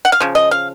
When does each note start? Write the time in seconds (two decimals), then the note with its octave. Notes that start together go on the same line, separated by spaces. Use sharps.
0.05 F#5
0.12 F5
0.20 C#3 F3
0.35 D#5
0.51 F5